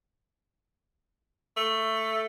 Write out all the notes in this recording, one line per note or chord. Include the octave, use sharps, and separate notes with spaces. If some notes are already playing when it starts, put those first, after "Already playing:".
A3